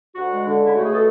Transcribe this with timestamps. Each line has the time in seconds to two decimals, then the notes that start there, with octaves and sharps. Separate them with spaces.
0.15 D2 F#4 F#5
0.30 G#3
0.45 D3
0.60 C#2
0.65 E4
0.74 A3 F#4
0.84 B2 G#4
0.94 A4